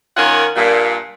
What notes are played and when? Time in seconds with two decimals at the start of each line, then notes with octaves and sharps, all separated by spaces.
0.16 D#3 A#3 C#4 F4 F#5
0.56 G2 A#2